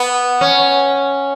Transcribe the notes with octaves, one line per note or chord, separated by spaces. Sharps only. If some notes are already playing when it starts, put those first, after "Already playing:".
Already playing: B3
C#4